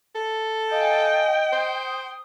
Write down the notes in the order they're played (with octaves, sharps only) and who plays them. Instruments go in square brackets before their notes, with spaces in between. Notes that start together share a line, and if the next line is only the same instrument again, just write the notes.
[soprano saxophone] A4
[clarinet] D#5 [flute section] F5 G#5 [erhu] G5
[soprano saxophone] C5 [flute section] D#6